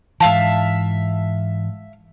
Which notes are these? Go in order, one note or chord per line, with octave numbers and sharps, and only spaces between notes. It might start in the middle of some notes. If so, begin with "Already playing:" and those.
G#2 E3 E5 F5 A5